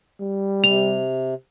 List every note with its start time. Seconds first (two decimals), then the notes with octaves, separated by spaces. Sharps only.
0.20 G3
0.64 C3 F7